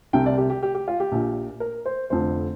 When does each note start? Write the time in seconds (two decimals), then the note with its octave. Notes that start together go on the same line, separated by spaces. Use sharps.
0.13 C2 C3 G5
0.26 D5
0.38 G4
0.50 G4
0.63 G4
0.75 G4
0.88 F4
1.00 G4
1.12 A#1 A#2
1.60 A#4
1.86 C5
2.10 F1 F2 D3 C5